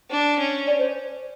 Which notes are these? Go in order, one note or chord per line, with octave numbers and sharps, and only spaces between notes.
D4
C#4
D5
C5